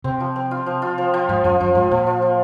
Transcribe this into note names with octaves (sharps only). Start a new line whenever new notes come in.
C3 C4
F3
C4
F4
F3
F4
F3
F3
G#2 F3
F#2 F3
F#2 F3
G#2 F3
A#2 F3
F3
F3